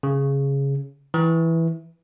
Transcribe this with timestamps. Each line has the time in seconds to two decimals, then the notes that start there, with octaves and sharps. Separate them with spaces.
0.03 C#3
1.14 E3